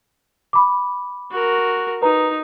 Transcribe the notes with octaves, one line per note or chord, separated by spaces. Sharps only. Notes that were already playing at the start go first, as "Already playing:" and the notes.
B5 D6
F#4 A#4
D#4 B4 A#5